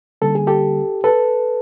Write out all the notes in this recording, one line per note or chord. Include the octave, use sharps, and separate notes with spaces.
D3 G3 A#3 C#4 A4
G#4
G4 A4
A4 B4